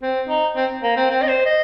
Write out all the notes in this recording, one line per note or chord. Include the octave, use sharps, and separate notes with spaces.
C4
D#4
C4
A#3
C4
C4
D#5
C5
D#5